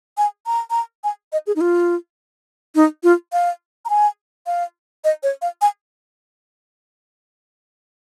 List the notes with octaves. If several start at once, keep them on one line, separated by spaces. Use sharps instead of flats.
G#5
A#5
A#5
G#5
D#5
G#4
D#4
F4
D#4
F4
F5
A#5
G#5
F5
D#5
C#5
F5
G#5